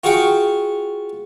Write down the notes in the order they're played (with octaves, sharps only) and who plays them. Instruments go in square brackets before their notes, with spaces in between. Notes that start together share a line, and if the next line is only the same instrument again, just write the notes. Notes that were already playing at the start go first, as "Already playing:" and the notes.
[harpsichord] F4 F#4 G#4 F5 G5 C#6